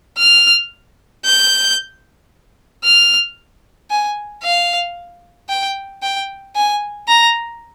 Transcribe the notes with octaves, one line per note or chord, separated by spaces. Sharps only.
F6
G6
F6
G#5
F5
G5
G5
G#5
A#5